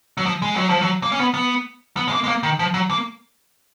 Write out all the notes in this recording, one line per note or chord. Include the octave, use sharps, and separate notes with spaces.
F#3
F3
G#3
F#3
F3
F#3
A#3
C#4
B3
B3
B3
G#3
A#3
G#3
A#3
D#3
F3
F#3
A#3